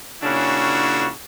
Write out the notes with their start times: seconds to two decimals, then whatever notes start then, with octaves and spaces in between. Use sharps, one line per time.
0.22 A#2 C#3 C#4 D4 E4 F#4